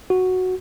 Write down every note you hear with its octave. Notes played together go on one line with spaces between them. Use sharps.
F#4